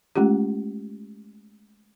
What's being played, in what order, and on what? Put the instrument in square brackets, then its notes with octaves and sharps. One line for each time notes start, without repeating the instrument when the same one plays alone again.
[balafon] G#3 A3 C#4 F4 G4